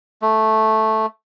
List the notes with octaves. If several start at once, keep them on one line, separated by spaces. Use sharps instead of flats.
A3